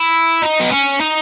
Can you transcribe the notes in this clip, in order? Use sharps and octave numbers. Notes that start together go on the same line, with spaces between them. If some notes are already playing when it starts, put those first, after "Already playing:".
Already playing: E4
D#4
B3
C#4
D#4